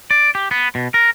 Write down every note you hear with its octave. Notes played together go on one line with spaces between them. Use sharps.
D5
G4
B3
B2
A#4